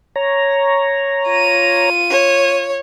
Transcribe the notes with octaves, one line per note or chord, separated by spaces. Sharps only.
C#5 A#5
F4 D#7
C#5